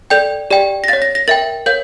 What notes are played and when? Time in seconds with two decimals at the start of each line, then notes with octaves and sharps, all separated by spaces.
0.10 A4 D5 G5 G6
0.50 G4 D5 G5
0.84 A#6
0.88 C#5 F5 A6
1.02 A#6
1.15 A#6
1.28 A#4 E5 G5 A6
1.66 A#4 C#5 F5 G6